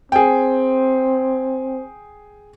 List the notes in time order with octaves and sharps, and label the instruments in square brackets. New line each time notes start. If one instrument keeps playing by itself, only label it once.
[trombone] C4 [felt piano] G#4 G5